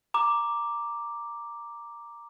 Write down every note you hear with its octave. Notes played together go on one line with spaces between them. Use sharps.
A#5 D6